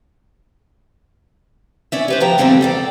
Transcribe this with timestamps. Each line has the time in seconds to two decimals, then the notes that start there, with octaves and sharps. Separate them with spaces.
1.92 C#4 D5 E5
2.08 G4 B4 C5
2.20 D2 F3 G5 A#5
2.38 E2 G#2 D3 G3 C4 A4
2.61 A4 D5 F5 G5